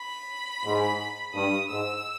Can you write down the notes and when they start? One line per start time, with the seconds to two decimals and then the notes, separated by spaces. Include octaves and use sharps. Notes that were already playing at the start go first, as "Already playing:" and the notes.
Already playing: B5
0.65 G#2
1.35 G2 D#6
1.70 G#2 E6